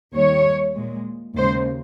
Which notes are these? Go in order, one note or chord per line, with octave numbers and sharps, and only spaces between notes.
D#2 D#3 G3 C#5
A#2 G#3
D#2 C#3 G#3 C5